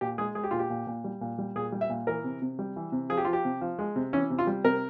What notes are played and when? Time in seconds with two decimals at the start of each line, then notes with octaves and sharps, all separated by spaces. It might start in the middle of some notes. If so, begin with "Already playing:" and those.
0.01 A#2 G4
0.18 G#3 G#4
0.35 G#3 G#4
0.44 G4
0.51 A#2 F4
0.59 G4
0.70 A#2
0.87 A#2
1.04 G3
1.21 A#2
1.38 G3
1.56 A#2 G#4
1.72 G3
1.81 E5
1.90 A#2
2.07 E3 A#4
2.24 C3
2.42 C3
2.59 G3
2.76 E3
2.92 C3
3.09 F3 G#4
3.17 G4
3.25 F3 F4
3.33 G4
3.45 C3
3.61 F3
3.79 G#3
3.96 C3
4.13 E3 C#4
4.30 C3
4.39 F4
4.47 G3
4.64 C3 A#4